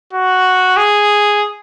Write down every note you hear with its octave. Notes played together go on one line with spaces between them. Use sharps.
F#4
G#4